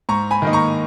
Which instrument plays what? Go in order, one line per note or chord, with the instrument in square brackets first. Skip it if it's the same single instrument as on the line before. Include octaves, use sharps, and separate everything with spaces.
[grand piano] G#2 A#5 C#6
G#5 B5
D#3 A#3 D#4
A#5 C#6